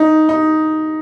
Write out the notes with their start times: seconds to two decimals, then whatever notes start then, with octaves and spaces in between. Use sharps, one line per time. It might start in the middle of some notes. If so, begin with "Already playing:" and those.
Already playing: D#4
0.29 D#4